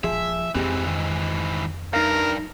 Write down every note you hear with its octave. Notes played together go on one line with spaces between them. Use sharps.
D#1 F3 G#3 G#4 E5
F2 G#2 E3 C4 G4 G#4
D#3 D#5
G2 D#4 A#4 E5 F5